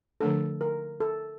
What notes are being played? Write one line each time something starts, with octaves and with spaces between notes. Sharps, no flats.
D3 F3 A3 D4 A4
A#4
A4